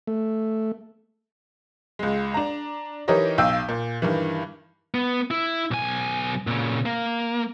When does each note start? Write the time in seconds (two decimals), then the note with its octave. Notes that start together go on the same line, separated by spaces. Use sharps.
0.07 A3
1.99 C#2 G#3
2.34 D4 A#5
3.08 E3 D#4 G4 A#4 C#5 D#5
3.38 B1 F5 G5 E6 G6
3.69 A#2
4.02 G2 D#3 E3
4.94 B3
5.31 E4
5.71 B1 G#5
6.47 A#2 C#3
6.86 A#3